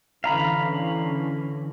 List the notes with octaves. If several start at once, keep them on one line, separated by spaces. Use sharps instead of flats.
D3 E3 C#4 F5 A#5 B5